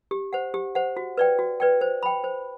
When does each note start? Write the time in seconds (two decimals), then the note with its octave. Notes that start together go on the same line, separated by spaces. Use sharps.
0.11 G4
0.33 C5 F#5
0.54 G4
0.75 C5 F#5
0.97 F#4
1.18 B4 D5 G5
1.39 F#4
1.60 B4 D5 G5
1.81 C5
2.03 G5 B5
2.24 C5